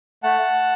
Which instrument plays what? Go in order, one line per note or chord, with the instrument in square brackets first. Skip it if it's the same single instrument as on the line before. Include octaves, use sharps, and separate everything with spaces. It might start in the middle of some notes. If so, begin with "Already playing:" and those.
[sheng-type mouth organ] A3 F#5 A5